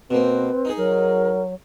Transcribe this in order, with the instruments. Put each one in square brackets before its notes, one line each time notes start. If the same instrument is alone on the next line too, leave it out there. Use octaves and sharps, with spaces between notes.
[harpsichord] B2 A#3 [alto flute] C4 [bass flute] B4
[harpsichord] D#4 G#4
[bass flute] F#3 [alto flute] A#4